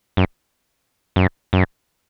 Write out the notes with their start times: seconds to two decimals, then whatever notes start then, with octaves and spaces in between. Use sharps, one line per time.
0.17 F#2
1.16 F#2
1.53 F#2